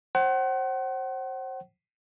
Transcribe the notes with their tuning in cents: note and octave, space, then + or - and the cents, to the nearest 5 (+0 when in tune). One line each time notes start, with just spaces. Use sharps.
C5 +30 F#5 +35